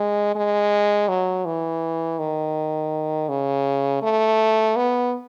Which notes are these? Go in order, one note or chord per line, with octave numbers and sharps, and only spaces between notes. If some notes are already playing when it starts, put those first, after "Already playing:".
Already playing: G#3
G#3
F#3
E3
D#3
C#3
A3
B3